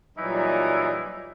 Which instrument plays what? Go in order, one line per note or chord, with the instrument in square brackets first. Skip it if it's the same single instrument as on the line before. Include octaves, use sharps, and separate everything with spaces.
[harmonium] A#2 F#3 G3 [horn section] E3 D#4